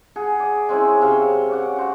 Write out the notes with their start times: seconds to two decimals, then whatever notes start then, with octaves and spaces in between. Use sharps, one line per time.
0.16 G#4 F#5
0.40 D5
0.69 G#3 C4 C#4 E4
1.01 C3 F5 G5 C#6
1.49 C#4 D5 F#5
1.77 F#4 C5 F#5